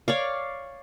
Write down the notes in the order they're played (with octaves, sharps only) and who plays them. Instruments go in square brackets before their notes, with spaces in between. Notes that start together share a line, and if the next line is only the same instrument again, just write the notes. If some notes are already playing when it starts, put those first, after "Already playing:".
[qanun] C#5 D5 F5